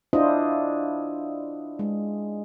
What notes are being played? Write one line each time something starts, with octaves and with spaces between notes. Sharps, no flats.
D4 E4 F4 C5 D#5
G#3